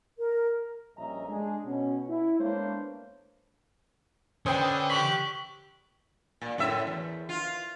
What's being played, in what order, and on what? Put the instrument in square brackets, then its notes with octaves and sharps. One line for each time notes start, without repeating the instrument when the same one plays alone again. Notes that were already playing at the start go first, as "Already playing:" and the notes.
[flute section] A#4
[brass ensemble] A#1 G2 C#4 D#5 E5 A#5
G#3 D4 G#4
B2 C#4
E4
G#3 A#3 B3 D4 C5 C#5
[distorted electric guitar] D3 [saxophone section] C#4 B4 C5 [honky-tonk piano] G5 D#6
[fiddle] G4 F#6 [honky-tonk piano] C#6 B6
[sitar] A#2
F#2 A2 E5
E2
F4